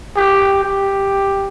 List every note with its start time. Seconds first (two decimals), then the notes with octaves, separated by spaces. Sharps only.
0.16 G4
0.64 G4